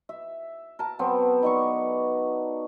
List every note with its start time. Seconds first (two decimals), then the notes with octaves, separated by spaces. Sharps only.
0.09 E5
0.79 A#4 A5
0.99 F#3 B3 C4 A4
1.43 D#4 D5 C#6